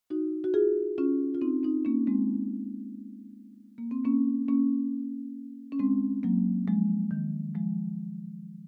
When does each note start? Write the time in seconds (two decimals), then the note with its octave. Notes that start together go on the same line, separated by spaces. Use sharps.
0.10 D#4 F#4
0.44 F#4
0.54 F4 G#4
0.98 C#4 F4
1.35 F4
1.41 C4 D#4
1.63 C4 D#4
1.85 A#3 C#4
2.07 G#3 C4
3.78 A#3
3.91 C4
4.05 A#3 C#4
4.48 A#3 C#4
5.72 C#4
5.79 G#3 C4
6.23 F#3 A#3
6.68 F3 G#3
7.11 D#3
7.55 F3 G#3